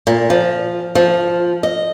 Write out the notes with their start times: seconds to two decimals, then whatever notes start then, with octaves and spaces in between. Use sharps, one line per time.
0.07 A#2
0.30 F3
0.95 F3
1.63 D#5